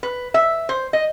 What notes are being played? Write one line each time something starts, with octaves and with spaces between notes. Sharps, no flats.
B4
E5
C5
D#5